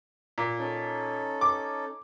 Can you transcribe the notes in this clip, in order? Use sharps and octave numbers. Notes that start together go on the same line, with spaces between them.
A#2
C#4 D#4 A4
D6